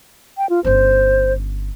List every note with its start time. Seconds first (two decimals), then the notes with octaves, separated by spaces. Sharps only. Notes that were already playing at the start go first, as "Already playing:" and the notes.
0.38 G5
0.50 F4
0.64 G1 C#4 C5